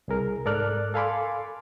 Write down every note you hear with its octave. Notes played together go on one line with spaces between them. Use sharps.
C2 G#4 A#4
G#2 A4 A#4 D5 F6 F#6
A4 F5 G#5 B5 C6 D6